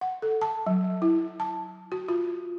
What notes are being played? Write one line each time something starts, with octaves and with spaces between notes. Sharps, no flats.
F#5
A4
A5
F#3
E4
A5
F#4
F4